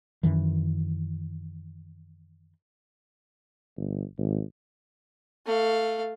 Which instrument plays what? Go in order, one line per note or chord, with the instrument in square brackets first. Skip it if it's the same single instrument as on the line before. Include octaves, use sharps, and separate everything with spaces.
[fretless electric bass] F#2 D#3 E3
[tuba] G1
G#1
[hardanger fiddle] A3 F5